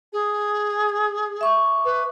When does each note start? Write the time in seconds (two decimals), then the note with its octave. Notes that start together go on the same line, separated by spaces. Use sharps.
0.13 G#4
1.41 E5 C#6 D6
1.85 B4